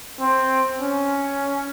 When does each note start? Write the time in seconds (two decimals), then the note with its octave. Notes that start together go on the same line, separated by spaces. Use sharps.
0.20 C4
0.80 C#4